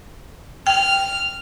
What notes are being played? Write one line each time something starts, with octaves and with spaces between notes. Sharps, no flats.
G5 F6